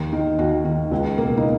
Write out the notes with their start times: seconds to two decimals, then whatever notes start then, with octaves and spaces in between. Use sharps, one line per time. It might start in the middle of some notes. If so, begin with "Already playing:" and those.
Already playing: D#2
0.13 D#3
0.38 D#2 F#4
0.65 D#3
0.91 C#2
1.18 B2 A#3
1.37 D#4